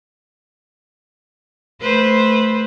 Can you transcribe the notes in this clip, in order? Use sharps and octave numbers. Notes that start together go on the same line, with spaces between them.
A3 B4 C5